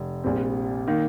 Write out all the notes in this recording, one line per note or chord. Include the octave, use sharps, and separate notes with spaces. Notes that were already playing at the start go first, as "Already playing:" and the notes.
Already playing: F1
A#1 A#2 G3 C4
D#3 A#3